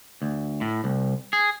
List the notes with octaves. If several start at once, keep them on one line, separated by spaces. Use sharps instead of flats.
D2
A2
C2
G#4